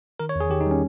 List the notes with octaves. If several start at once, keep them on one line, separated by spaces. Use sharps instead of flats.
D#3 A#4
C#5
E2 G#4
D#3 G4
D#4
G3 C#4